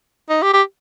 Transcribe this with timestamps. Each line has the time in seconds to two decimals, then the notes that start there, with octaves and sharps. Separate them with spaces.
0.29 D#4
0.42 G4
0.53 G4